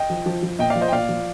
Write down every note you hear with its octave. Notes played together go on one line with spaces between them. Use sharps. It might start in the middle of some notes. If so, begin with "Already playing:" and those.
Already playing: D#5 G5
F3
F3
F3
A#2 D#5 G5
D5 F5
F3
C5 D#5
G5
A#2 D5 F5
F3